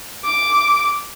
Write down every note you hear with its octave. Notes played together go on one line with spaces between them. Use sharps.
D6